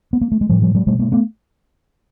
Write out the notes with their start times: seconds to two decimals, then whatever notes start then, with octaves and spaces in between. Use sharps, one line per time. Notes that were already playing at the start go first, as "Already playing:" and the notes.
0.13 B3
0.21 A#3
0.32 A3
0.41 G#3
0.49 A2 F3 G3
0.62 F3 G3
0.75 F#3 G#3
0.87 B2 G3 A3
0.99 G#3 A#3
1.12 A3 B3